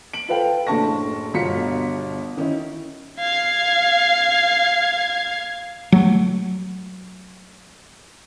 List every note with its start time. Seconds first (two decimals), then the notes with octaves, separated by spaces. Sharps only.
0.13 D7 F#7
0.28 F4 A4 B4 F5 G5
0.67 F#1 A2 D3 A5 C#6 A#6
1.34 G1 B2 F4 A#5 B6 C#7
2.37 D#3 C#4 D#4 E4
3.20 F5 G#6
5.92 F#3 A3